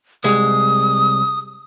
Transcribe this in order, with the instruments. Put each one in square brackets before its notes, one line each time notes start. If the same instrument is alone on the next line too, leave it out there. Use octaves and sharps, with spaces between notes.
[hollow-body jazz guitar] C2 G#3 [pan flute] D#6